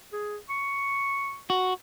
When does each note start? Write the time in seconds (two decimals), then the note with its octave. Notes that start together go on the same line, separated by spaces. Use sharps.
0.13 G#4
0.50 C#6
1.50 F#4